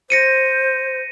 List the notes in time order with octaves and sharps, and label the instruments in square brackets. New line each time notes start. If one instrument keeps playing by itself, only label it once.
[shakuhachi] C5 [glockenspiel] A#6 C#7 D#7